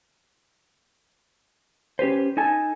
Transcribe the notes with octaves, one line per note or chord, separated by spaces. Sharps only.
C#4 G4 B4 C5
D#4 A4 G#5 A5